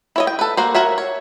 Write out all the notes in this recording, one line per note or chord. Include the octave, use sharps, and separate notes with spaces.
E4 C#5 D#5
G5
A4 B4
A#3 F#4 C5
F#4 A#4 C#5 E5
C#5